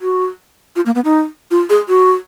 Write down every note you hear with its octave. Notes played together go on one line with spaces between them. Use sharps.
F#4
F4
A#3
B3
D#4
F4
G#4
F#4